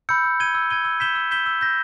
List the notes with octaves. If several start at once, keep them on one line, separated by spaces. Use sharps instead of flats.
B5 E6 G6 C#7
E6
G#6 D#7 G7
E6
G#6 D#7 G7
E6
G6 B6 E7 G7
E6
G6 B6 E7 G7
E6
G6 A#6